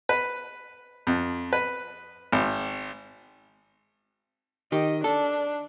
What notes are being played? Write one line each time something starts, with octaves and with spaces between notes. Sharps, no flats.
B4
F2
B4
G#1
D#3 G4 D#5
D4 A4